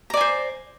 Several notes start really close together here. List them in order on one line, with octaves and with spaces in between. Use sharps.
A#5 D5 G#5 C5